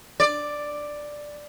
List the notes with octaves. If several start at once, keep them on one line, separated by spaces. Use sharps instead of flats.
D5